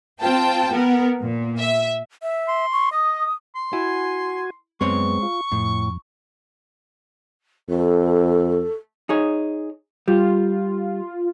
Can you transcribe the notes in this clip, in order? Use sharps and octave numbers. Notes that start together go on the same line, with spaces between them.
C4 F4 G5 A5
B3 A#4
A#2
E5
E5
C6
C#6
D#5 D#6
C6
E4 F#4 G#5
F#2 G#3 B3 C4 C#5 C#6
F4
F2 A2
F2 A4
D#4 G#4 C#5
G3 F4